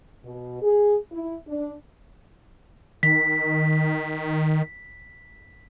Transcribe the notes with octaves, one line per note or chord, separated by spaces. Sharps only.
B2
G#4
E4
D4
D#3 B6